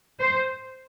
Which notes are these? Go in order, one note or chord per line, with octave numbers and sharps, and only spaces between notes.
C5